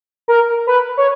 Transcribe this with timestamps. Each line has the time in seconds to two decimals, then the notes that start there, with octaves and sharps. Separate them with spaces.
0.28 A#4
0.67 B4
0.97 C#5